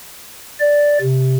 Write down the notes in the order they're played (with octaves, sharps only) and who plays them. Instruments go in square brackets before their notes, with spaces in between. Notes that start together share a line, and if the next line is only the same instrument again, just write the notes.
[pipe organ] D5
C3